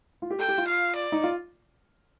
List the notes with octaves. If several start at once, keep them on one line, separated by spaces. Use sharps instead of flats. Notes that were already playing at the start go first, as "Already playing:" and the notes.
F4
G4
A4 G5
G4
F4
F5
D5
D#4
F4